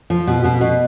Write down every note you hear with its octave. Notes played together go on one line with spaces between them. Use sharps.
F3
B2
B2
B2